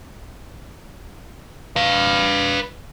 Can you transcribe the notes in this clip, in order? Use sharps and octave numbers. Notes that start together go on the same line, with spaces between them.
B4 F5